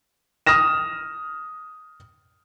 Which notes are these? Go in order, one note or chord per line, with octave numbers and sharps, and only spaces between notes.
D#6 F6 A#6 E7